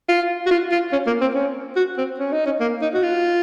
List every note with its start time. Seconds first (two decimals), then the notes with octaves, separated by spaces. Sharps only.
0.09 F4
0.46 F#4
0.51 F4
0.72 F4
0.92 C#4
1.07 A#3
1.21 C4
1.34 C#4
1.76 F#4
1.98 C4
2.19 C#4
2.32 D#4
2.46 C#4
2.60 A#3
2.82 D#4
2.94 F#4
3.03 F4